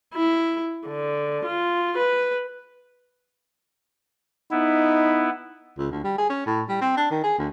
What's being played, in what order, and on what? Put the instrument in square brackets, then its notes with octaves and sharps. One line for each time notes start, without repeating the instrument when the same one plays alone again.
[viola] E4
D3
F4
B4
[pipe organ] B3 E4 [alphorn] D#4
[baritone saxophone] C#2
D2
G3
G#4
C#4
A2
G3
C4
D4
D#3
G#4
D2